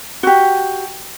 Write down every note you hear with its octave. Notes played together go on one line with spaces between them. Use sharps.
F#4 G4